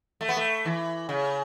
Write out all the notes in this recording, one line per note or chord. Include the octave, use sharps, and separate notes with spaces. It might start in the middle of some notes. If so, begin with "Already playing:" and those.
A3
B3
A3
E3
C#3